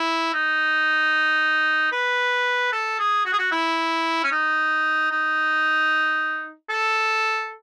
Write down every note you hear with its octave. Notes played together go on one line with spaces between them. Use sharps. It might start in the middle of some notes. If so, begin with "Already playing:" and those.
Already playing: E4
D#4
B4
A4
G#4
F#4
G#4
F#4
E4
C#4
D#4
D#4
A4